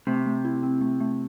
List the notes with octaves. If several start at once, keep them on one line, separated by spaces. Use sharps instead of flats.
C3 A3
A3
E4
C4
A3
A3